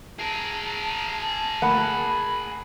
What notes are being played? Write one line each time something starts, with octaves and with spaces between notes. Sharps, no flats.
G#4 A#4 A5
D2 A#3 F#5 B5